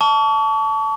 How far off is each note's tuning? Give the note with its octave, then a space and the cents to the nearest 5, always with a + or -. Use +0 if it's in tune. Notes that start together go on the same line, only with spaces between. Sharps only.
A5 +0 C#6 +40